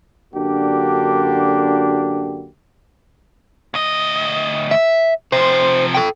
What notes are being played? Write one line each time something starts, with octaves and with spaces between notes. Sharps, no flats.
F#2 D3 A#3 D4 F#4 G4
D2 D#5
E5
C3 F3 C5
A4 G5